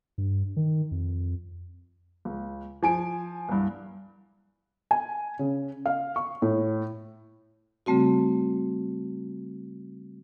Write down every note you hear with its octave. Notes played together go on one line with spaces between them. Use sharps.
G2
D#3
F2
C#2
F3 G#5 D7
C2 G2
G#5
C#3
F5
C#6
A2
C#3 G3 A3 C4 F#4